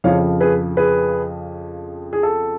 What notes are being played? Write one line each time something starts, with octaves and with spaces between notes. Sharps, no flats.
F2 C#3 F3 C#5 F5
G#4 B4
G#4 B4
G#4
A4